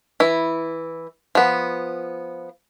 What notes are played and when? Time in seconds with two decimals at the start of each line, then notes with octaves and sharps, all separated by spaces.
0.20 E3 E4
1.35 F3 B3